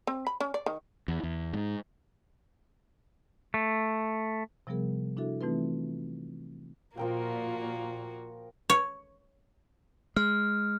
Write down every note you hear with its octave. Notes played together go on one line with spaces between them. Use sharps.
C4
B5
C#4
D5
D#3
E2
E2
G#2
A3
C3 F3 G3 B3 G#4 A#4
D4 E4 F#4 A4 E5
E3 A3 C4 D#4 F4 B4
A#2 F3 A#3 F4 F#4 A#4 G5
C#5
G#3 F6